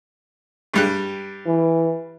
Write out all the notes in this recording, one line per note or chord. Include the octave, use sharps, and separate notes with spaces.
G2 G3 F#6
E3